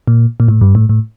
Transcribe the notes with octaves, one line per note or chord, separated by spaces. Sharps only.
A#2
A#2
A2
G2
A2
A2